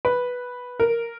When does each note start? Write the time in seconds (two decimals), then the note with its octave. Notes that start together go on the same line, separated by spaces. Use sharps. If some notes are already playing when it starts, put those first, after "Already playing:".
0.05 B4
0.80 A#4